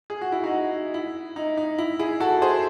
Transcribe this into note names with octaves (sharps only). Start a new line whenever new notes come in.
G#4
F#4
E4
D#4 F#4
E4
D#4
D#4
E4
E4 G#4
F#4 A4
G#4 C5